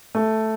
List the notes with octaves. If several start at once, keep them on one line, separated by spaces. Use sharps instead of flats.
A3